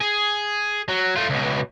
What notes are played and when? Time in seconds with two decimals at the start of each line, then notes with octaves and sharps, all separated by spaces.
0.01 G#4
0.89 F#3
1.16 A3 F4
1.30 C#2 B2